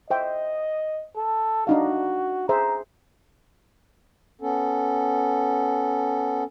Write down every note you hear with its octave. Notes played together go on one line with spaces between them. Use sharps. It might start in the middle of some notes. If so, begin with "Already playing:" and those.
C5 D#5 E5 G5
A4
D4 D#4 F#4 F5
G#4 C5 E5 A#5
B3 C#4 A4